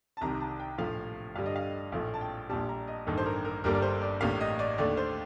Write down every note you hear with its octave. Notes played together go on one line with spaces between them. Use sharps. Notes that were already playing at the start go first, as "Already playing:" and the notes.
A5
C2 C3 D#3 A#5
A5
G5
A#1 A2 F3 A3 F5
G2 D3 G3 F5
D#5
F5
A#1 A2 F3 A3 F5
A5
G5
A#1 A#2 G3 A5
A#5
D#5
A1 G2 D#3 A#3 A4
C5
A#4
A#4
G1 G2 D3 G3 A#3 A#4
D5
C5
D5
A1 A2 G3 A#3 F5
D#5
D5
D#2 D3 A3 D5
C5